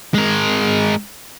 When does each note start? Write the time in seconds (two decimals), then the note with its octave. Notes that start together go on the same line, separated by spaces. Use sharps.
0.14 G#3 A#4